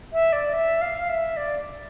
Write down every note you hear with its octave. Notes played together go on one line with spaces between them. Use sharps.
E5
D5
E5
F5
E5
D5